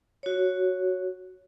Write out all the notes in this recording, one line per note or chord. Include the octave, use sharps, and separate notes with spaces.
F#4 C#5